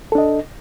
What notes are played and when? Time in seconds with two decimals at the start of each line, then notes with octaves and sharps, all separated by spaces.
0.12 A4
0.15 D4
0.18 D#5